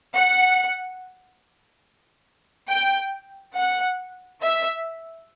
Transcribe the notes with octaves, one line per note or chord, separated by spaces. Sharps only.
F#5
G5
F#5
E5